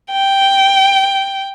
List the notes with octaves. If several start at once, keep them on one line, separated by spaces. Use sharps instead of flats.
G5